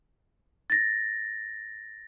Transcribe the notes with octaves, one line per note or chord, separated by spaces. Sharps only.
A6 A#6